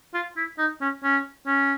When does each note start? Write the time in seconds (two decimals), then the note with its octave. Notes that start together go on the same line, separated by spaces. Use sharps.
0.14 F4
0.37 E4
0.58 D#4
0.81 C#4
1.03 C#4
1.46 C#4